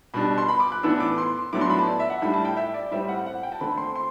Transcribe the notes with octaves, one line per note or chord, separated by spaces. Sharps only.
B2 G3 D4 B5
C6
B5
D6
F#6
A2 E3 B3 D4 E6
D6
C6
A2 F#3 B3 D4 D6
C6
B5
A5
D5
E5
F#5
A2 G3 D4 B5
A5
G5
E5
D5
A2 G3 C4 E5
F#5
F#5
G5
A5
D3 A3 C4 B5
C6
C6